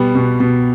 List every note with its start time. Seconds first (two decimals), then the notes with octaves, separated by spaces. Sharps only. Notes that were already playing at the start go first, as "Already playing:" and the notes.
Already playing: B2 G3 B3
0.15 B2
0.40 B2